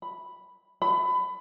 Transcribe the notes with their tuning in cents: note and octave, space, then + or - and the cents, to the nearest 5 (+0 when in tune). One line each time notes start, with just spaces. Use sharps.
B5 +0
B5 +25